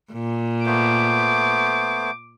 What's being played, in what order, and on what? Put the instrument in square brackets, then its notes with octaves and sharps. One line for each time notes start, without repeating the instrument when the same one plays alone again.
[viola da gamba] A#2
[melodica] A3 B3 C5 [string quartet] D6